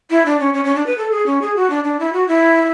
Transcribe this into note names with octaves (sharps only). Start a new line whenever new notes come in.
E4
D4
C#4
C#4
C#4
D4
B4
A4
G#4
C#4
G#4
F#4
D4
D4
E4
F#4
E4